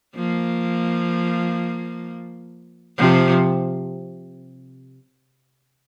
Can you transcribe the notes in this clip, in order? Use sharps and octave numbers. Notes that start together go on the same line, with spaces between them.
F3 A#3
C3 F3